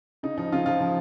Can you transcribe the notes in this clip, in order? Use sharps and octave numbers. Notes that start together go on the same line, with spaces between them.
C#3 D#4
F3 D#4
C#3 F4
F3 F4
F3